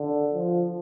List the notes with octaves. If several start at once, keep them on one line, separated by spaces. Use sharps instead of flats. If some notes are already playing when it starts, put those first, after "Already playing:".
Already playing: D3
F3